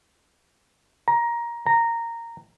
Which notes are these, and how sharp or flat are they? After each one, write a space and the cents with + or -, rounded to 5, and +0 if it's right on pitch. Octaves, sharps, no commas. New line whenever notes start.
A#5 +15
A#5 -10